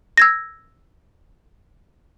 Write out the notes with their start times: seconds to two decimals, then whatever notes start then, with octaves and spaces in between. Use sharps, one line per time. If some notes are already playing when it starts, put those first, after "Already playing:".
0.17 E6 G#6 A#6